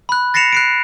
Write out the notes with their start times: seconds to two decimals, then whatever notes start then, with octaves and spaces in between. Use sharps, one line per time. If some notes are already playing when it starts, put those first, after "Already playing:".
0.09 B5 F#6
0.34 A6 A#6 C7 C#7 E7 F7
0.53 F#6 C7 D7